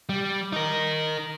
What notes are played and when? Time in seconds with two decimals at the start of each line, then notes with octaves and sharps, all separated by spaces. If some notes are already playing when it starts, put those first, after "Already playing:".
0.09 G3
0.53 D#4 A#4